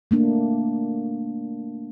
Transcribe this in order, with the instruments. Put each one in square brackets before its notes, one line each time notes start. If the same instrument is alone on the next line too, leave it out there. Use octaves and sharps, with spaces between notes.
[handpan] A3 A#3 D4